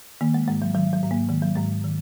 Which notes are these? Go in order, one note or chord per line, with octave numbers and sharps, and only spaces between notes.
D#3 A#3
G#3
G#2 G#3
F#3
D#3 F#3
F#3
G#2
A#3
D#3 G#3
F#3
G#2 G#3
D#3